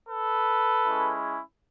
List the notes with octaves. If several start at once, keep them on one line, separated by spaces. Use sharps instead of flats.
A4 B4
G#3 C#4 E4